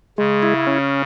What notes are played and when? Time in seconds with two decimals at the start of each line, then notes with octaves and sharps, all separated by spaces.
0.18 C#3 G#3
0.43 E4
0.67 C#4